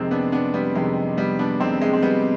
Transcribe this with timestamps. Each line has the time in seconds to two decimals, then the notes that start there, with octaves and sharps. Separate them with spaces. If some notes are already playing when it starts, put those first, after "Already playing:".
Already playing: F2 C3 D#3 G#3 C4
0.11 B3 D4
0.32 B3 D4
0.54 G3 B3
0.75 F2 C3 D#3 G#3
1.17 G3 B3
1.39 B3 D4
1.60 F2 C3 D#3 G#3 C4
1.82 G#3
1.93 C4
2.02 G3 B3